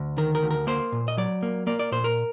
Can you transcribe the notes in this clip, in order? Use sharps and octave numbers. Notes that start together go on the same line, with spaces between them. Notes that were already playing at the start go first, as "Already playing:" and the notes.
Already playing: D2
D#3 A#4
A#4
D2
A#4
A#3 C5
A#2
D#5
F#3 D5
A#3
A#3 D5
D5
A#2 C5
A#4